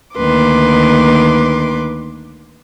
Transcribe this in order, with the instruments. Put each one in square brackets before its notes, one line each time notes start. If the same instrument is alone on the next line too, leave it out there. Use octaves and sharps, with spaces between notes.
[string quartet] D2 D#3 A#3 B4 C6 D6